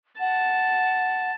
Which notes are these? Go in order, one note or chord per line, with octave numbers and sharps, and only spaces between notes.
F#5 A5